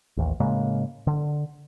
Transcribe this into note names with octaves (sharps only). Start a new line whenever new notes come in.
A1 D#2
A2 C#3 G#3 A#3
D3